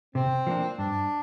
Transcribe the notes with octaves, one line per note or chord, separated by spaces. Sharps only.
C3 C4
F3 A#3 D4
G2 D4